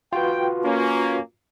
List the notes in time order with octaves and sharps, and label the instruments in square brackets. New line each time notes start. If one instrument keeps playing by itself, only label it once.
[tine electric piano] F4 F#4 B4 [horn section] G5
[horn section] A#3 C#4